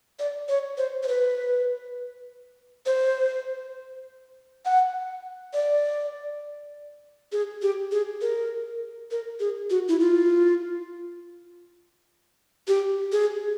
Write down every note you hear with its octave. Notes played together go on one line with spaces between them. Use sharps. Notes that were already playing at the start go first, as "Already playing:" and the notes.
D5
C#5
C5
C5
B4
C5
F#5
D5
G#4
G4
G#4
A#4
A#4
G#4
F#4
E4
F4
G4
G#4